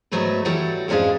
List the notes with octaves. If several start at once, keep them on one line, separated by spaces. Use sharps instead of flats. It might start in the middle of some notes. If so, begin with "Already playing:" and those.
G#2 F#3 A3 B3 B4
E3 F#3 G3 F#4 A4 C#5
F2 G#2 C#4 D4 G#4 F5